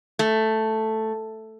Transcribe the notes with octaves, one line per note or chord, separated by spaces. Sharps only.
A3